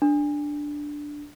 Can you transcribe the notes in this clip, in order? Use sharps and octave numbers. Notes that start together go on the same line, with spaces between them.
D4